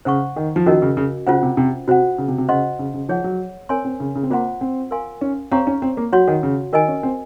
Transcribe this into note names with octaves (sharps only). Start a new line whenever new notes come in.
C#3 C5 F#5 C#6
D#3
F3
D#3 C#4 F#4 A#4 D#5
C#3
C#3
C#3 C#4 F4 C5 F#5
C3
C3
C3 F#4 C5 F#5
C#3
C3
C3
C#3 C5 D#5 F#5 C6
C#3
C#3
F3 G#4 C#5 F#5
F#3
C4 A#4 C#5 G#5 C6
C4
C#3
C#3
C4
A#3 F4 C5 F#5 C6
C4
A#4 F5 G#5 C6
C#4
C4 G#4 C#5 F5 A#5 C#6
C#4
C4
A#3
F#3 F#4 C#5 F#5 C6
D#3
C#3
D#3 A#4 D#5 G#5
C#4
C4